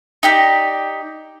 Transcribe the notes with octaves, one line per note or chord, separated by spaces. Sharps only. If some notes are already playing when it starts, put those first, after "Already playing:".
D#4 G4 D5